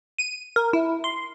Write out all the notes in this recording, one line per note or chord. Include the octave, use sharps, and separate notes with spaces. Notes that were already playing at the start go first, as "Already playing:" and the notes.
D#7
A#4
E4
C6